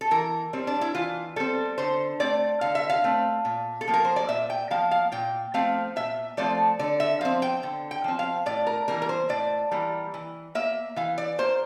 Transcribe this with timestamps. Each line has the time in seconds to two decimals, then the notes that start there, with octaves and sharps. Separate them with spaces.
0.01 A4
0.11 E3 A#4
0.53 G3 C4
0.67 D4
0.81 E4
0.95 E3 F4
1.36 G3 C4 A4
1.78 D3 C5
2.20 A3 C4 D5
2.61 D3 F5
2.75 E5
2.90 F5
3.04 A3 C4
3.45 A#2
3.81 A4
3.88 F3 A#3
3.94 A#4
4.05 C5
4.16 D5
4.29 A#2 E5
4.50 G5
4.71 F3 A#3 F5
4.91 F5
5.12 A#2 G5
5.54 F3 A3 C4 F5
5.96 A#2 E5
6.37 F3 A3 C4 D5
6.79 D3 D5
7.00 E5
7.21 F3 C4 F5
7.42 G5
7.63 D3
7.91 G5
8.04 F3 C4
8.19 F5
8.46 A2 D5
8.67 A#4
8.88 E3 G3 A#3 A#4
9.02 A#4
9.09 C5
9.29 A2 D5
9.72 E3 G3 A#3
10.14 E3
10.55 A#3 E5
10.96 E3 F5
11.18 D5
11.38 A#3 C5